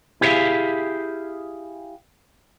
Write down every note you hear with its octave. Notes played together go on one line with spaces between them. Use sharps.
E4 G4 G#4 C#5 E5 F5